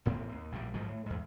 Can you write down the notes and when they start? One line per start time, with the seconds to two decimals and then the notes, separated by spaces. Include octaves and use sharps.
0.06 A1 A2 B3 C4
0.32 D#2
0.52 A#1 A2 C#3 G3
0.74 G#2 D#3 F3 F#3
0.88 A2
1.06 E2 G#2